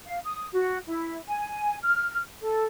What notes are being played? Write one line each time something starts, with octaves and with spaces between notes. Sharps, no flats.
F5
D#6
F#4
E4
G#5
F6
A4